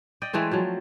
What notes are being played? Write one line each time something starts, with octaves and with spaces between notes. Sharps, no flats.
D5 D#5 G5
E3 G#3 A3 C4
F3 F#3